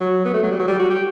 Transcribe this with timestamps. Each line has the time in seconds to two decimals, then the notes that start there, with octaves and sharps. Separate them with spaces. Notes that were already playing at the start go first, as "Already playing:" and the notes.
0.01 F#3
0.25 B3
0.34 A3
0.43 F#3
0.51 G3
0.59 F#3
0.68 G3
0.79 F#4
0.90 G4